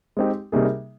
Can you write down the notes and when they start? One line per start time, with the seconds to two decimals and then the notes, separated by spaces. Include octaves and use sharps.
0.17 G#3 C4 D#4 G4
0.52 C3 G3 A#3 D#4 G#4